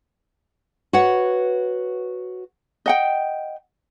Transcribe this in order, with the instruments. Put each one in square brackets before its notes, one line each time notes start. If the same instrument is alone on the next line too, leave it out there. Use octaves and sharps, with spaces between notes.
[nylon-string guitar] F#4 B4 C#5 F#5
[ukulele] D#5 F#5 G5